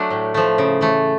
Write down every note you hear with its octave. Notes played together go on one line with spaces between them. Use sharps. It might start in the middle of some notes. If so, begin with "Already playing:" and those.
Already playing: F#3 A3 D4 F#5
A2
F3 A3
C#3
E3 A3